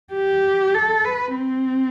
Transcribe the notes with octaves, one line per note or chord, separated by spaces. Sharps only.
G4
A4
B4
C4